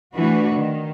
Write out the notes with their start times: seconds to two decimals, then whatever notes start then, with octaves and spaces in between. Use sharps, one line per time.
0.14 E3 A3 D4 F#4 B4
0.57 D#3